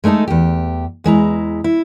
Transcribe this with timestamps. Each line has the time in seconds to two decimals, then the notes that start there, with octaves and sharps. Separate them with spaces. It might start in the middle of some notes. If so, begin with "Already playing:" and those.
0.04 G#3 A3 D4 D#4 A4
0.28 E2 G4
1.04 E2 G#3 E4 A#5
1.64 E4